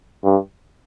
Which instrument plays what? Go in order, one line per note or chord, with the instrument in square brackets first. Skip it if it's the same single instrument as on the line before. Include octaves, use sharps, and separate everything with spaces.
[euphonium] G2